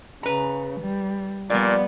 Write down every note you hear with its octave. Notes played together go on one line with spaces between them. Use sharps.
C#3 B4 A#5
G3
A#2 F3 G3 B3 D5